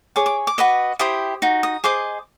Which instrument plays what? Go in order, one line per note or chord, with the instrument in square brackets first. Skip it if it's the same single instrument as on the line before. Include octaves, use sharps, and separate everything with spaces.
[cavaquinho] G#4 C#5 D6
D6
D6
F#4 B4 D#5
E4 G4 C5 D#6
D#4 F#4
D#6
G#4 C5 D#5 D6